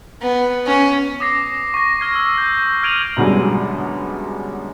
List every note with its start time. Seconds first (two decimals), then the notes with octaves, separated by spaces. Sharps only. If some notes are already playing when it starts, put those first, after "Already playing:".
0.21 B3
0.66 C#4
1.20 D6 D#6 A#6 C7
1.74 C#6 A#6
2.00 F6 G#6 C7
2.15 E6
2.38 G6
2.83 F6 G#6 D7 D#7 F7 F#7
3.17 F#2 B2 D3 G3 G#3